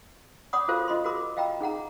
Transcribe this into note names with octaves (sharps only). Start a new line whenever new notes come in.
C#5 D5 F#5 B5 D6 D#6
F4 F#4 A4 A#4 C5 F5
F4 D#5 B5 C6
F#4 G#4 A#4 B5 D6
D#5 F5 G5 A#5 B5
D#4 G#4 F#5 A#5